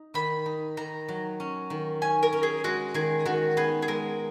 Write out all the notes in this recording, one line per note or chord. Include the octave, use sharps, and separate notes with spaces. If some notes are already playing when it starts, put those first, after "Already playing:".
Already playing: D#4
D#3 B5
D#4
D#3 A#5
F#3
C#4
D#3
C#4 G#5
A#4
C#4
G#4
G#3 F#4
D#3 G#4
D#3 F#4
B3 G#4
G#4
G#3 A#4